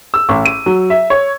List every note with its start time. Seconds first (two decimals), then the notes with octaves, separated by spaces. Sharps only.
0.14 E6
0.29 A1
0.45 D#7
0.66 F#3
0.90 E5
1.10 C#5